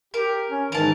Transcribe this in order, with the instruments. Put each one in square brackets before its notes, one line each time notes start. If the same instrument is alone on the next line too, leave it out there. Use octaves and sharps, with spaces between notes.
[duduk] G4 [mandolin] A#4
[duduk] C#4
[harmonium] G#2 D#3 [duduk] E3 [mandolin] A#4 A5